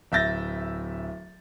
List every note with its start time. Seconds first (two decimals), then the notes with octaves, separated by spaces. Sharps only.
0.12 D1 E5 G6 A6 A#6